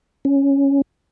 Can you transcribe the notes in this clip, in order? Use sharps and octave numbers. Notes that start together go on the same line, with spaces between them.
C#4